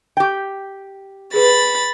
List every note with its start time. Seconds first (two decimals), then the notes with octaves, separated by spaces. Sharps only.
0.17 G4 G5
1.34 G#4 B4 B5 A6